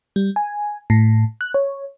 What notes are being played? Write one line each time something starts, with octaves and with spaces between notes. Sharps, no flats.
G3
G#5
A2
F#6
C#5